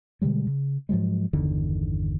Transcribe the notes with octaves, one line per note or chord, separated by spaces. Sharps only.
B2 D3 G3 G#3
C#3
G#2 F3 F#3 G#3
G1 E2 D3 D#3